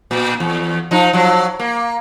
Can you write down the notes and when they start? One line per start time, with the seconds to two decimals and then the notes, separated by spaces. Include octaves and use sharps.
0.11 A#2
0.40 E2
0.91 F3 D#4
1.13 F3 F#3
1.59 A#3